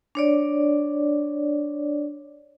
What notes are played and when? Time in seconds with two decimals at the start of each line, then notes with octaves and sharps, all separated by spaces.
0.15 D4 C#5 D5